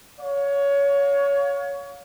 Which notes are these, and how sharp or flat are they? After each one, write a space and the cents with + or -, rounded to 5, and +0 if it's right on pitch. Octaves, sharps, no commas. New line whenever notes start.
C#5 +20 F5 +35